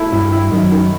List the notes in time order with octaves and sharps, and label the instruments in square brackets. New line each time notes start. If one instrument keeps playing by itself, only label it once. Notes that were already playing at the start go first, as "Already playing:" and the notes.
Already playing: [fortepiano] A3 E4
[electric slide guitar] G2 G3 [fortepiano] E4
[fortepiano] E4
[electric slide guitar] F#2 F#3 [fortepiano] D#3
[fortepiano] D#3